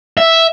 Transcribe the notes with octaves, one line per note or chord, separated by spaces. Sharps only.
E5